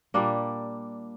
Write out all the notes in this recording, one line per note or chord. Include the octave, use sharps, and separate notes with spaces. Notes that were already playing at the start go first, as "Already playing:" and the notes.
A#2 G3 A#3 D4